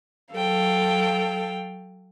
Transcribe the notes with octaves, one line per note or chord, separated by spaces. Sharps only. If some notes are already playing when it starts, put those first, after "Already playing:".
F#3 A4 F5 G5